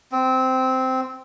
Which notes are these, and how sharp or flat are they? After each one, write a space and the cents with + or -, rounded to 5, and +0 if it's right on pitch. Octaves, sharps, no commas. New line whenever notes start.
C4 -10